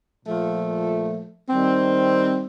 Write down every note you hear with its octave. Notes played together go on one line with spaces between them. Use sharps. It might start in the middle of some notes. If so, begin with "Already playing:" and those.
A#2 F3 A3
D#3 G3 C4